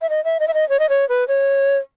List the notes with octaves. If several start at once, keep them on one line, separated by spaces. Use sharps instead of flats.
E5
D#5
E5
D#5
E5
D#5
C#5
D#5
C#5
B4
C#5